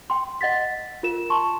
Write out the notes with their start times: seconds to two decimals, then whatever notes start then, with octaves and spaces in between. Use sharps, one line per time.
0.10 G5 C6
0.41 D#5 F#5 A6 B6
1.03 F4 A#4 E7
1.30 A5 C6 C#6